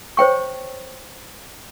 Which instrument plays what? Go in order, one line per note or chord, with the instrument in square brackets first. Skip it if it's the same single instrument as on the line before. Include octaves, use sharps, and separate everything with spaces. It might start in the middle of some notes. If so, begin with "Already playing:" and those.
[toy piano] C5 C#5 G5 C#6